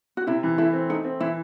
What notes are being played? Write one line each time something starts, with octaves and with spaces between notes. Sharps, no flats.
F#4
C3 E4
E3
A3 E4
C4
A3 D#4
C4
E3 E4